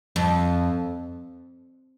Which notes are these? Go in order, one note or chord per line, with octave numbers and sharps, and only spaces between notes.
F2